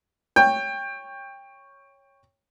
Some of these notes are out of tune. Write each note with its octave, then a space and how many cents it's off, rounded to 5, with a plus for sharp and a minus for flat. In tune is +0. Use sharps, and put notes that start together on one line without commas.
C#5 +0 G5 +20